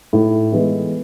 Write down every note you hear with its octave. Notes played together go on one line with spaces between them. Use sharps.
A2
E3 G#3 B3 E4